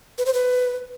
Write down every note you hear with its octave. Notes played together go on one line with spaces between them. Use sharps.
B4
C5
B4